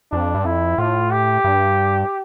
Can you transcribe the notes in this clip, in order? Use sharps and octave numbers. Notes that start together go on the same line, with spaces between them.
F2 D4
G2
F2 E4
A2 F4
G4
G2